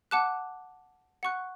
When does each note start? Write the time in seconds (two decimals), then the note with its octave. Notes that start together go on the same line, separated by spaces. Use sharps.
0.11 F#5 A5 D6 F#6
1.23 F#5 C#6 F#6